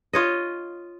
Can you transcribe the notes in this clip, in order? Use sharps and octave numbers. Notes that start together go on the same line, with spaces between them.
F4 C#5 D#5